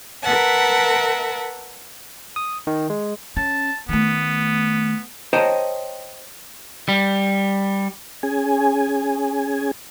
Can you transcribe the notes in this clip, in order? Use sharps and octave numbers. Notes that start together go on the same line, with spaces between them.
A#4 B4 E5 F#5 A5
D#6
D#3
G#3
C#4 A5
D#3 A3 B3
C5 C#5 D#5 G5 A5 A#5
G3
C#4 G#4 G#5